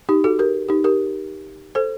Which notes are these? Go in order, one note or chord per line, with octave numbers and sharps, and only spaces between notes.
D#4 G4
F#4 A4
G4 A#4
D#4 G4
G4 A#4
A4 C5